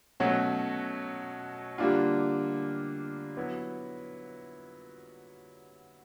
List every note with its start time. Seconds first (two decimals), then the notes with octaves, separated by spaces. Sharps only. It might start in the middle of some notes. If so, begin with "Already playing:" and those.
0.20 B2 F#3 A3 C#4 F#4
1.78 D3 G3 A#3 D4 F4
3.37 F#3 B3 E4